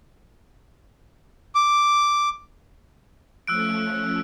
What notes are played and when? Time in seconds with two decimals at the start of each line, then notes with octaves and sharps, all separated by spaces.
1.55 D6
3.47 F3 A3 C#4 E6 F#6 D7